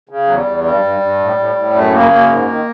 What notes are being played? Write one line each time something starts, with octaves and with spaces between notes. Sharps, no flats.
C#3
E2 F#3
G3
E2
G2 G3
G2
G2
A2
A2
A2
F#2 A3
C#3 A#3
F#2 A#3
G#2
D#3